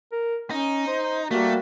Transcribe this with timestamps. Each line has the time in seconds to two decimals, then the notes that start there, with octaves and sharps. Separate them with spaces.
0.12 A#4
0.51 C#4 D#4
0.87 C5
1.31 G3 A3 A#3 F#4